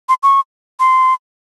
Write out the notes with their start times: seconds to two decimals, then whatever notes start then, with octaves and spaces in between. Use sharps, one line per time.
0.09 C6
0.23 C#6
0.80 C6